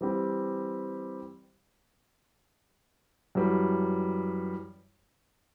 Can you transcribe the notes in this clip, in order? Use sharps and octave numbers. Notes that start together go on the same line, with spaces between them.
E3 G3 C4 G4
F#2 E3 G3